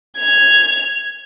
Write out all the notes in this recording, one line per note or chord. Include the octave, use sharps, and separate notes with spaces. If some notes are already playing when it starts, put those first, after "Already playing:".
G#6 F7